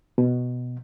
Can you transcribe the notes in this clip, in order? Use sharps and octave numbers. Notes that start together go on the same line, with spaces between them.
B2